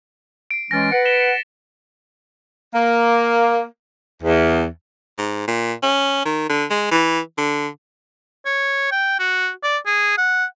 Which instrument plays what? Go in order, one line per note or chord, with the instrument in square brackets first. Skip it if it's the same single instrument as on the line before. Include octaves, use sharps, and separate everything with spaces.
[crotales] C7 D7
[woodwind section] E3 G#3 C#4 [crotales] A6 A#6
[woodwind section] B4 F#5 [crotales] C#7
[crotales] B6 E7 G7
[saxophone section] A#3
E2
[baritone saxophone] G#2
A#2
C#4
D#3
D3
G#3
E3
D3
[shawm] C#5
G5
F#4
D5
G#4
F#5